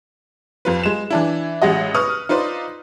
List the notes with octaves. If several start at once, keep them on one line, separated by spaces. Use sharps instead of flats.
F2 F4 B4
G#3 E7
E3 D4 E4
A1 G#3 F#4 D#5
B4 C#6 D#6 F6
D#4 F4 B4 C5 D5